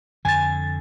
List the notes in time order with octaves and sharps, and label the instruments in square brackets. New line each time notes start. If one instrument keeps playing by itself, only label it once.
[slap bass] F2 D3 [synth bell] G#5 A6